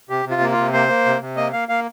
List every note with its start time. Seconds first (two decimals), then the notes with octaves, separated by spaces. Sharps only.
0.10 C3 G4
0.26 C3
0.31 F4
0.41 A#3
0.52 F4
0.58 C3
0.73 A#3 C5
0.89 A#3
1.06 C3
1.21 C3
1.37 A#3 D#5
1.53 A#3 F5
1.69 A#3 F5